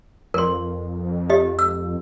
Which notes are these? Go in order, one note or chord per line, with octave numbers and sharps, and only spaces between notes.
F2 A#4 C6
G4 D#5
E6